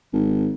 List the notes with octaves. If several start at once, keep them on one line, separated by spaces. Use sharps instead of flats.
G#1